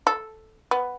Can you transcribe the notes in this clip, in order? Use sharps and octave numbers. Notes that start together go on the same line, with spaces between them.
A4
B3